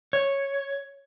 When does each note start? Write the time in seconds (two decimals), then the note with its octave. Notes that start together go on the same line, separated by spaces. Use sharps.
0.13 C#5